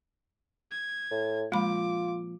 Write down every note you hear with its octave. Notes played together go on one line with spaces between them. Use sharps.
G#6
A2
A#2 F3 G#3 F4 B5 D6